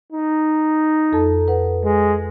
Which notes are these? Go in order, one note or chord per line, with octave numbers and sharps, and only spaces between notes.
D#4
F2 A4 A5
B4 F#5
G#3